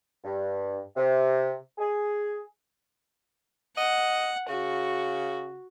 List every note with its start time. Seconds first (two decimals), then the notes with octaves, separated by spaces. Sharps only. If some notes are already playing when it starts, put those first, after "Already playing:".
0.24 G2
0.96 C3
1.78 G#4
3.77 D#5 F#5
4.49 C#3 F#4